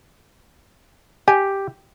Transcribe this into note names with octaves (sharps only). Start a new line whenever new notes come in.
G4 G#5